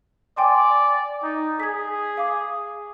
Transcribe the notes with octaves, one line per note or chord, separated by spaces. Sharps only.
D5 G5 G#5 C6
D#4
G#4 G#6 B6
F5 D6